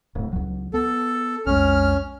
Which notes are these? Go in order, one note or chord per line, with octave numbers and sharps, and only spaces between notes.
D1 A2
C#2 F#3
B3 A4
B1 F2 G#3 C#4 F6